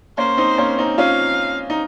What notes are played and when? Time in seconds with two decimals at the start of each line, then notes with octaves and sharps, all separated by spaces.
0.18 A#3 C#4 C5
0.37 C4 D#4
0.58 A#3 C#4
0.78 C4 D#4
0.98 C#4 F4 F5
1.70 D#4